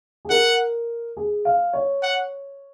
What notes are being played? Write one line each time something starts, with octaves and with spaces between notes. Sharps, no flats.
G#4
A#4 F#5
G#4
F5
C#5
F#5